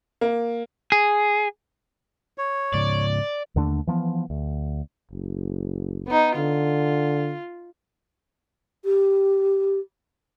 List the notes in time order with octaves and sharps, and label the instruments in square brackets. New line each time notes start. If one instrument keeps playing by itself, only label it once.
[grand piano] A#3
[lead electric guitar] G#4
[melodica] C#5
[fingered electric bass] G#2 C#3 [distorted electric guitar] D5
[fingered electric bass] D#2 D3 A3 D4
E3 F3 B3
D2
[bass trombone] F#1
[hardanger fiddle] B3 D#4
[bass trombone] D3 [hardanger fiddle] F4
[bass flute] G4